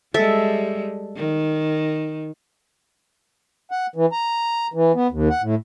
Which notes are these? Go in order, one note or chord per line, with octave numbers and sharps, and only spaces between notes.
G3 G#3 A4 E5
D#3
F#5
E3
A#5
E3
B3
D#2
F#5
A2